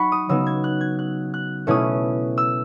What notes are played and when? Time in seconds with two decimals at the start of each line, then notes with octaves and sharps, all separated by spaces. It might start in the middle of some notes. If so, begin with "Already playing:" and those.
Already playing: F#3 D#4 F#5 B5 C#6
0.12 D#6
0.29 C#3 F#3 B3 D#4 E6
0.47 G#6
0.64 F#6
0.81 G#6
0.99 F#6
1.34 F#6
1.67 B2 A3 C#4 E4 D#6
2.38 E6